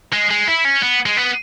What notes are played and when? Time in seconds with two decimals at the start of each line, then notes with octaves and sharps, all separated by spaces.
0.13 G#3
0.30 G#3
0.47 E4
0.65 C#4
0.83 B3
1.06 G#3
1.17 B3